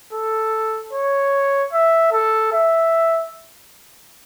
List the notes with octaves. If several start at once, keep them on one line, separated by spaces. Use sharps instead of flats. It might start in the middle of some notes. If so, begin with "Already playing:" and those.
A4
C#5
E5
A4
E5